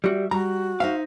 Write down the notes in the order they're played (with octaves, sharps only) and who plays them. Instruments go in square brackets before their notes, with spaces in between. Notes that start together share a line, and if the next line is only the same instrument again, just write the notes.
[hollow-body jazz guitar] G3 F#4 [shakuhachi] E5
[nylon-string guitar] G3 [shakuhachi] F#4 [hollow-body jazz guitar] A#5
[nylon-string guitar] D#4 C5 E5 [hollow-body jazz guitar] F5